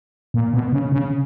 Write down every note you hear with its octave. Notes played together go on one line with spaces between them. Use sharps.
A#2
B2
C#3
C#3